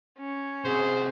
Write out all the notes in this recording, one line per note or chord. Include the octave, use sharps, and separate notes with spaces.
C#4
C3 F#4 G#4 C5